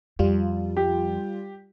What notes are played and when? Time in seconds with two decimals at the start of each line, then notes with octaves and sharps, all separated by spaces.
0.19 F2 G3 F4
0.77 G4